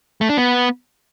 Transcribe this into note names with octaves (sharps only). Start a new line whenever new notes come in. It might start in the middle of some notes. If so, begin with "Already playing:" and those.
A3
D4
B3